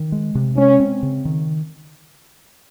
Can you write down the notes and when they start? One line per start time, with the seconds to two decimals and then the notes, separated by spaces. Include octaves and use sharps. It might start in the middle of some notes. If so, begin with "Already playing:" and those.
Already playing: D#3
0.12 G#3
0.35 C3
0.57 G#3 C#4
0.80 C4
1.03 C#3
1.25 D#3